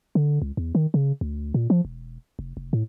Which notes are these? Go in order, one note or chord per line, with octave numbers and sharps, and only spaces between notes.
D3
C#2
E2
D#3
C#3
D2
A#2
F3
E1
F1
F1
A2